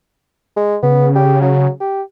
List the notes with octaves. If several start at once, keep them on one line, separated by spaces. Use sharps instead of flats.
G#3
C#3 B3
G4
F#3
G4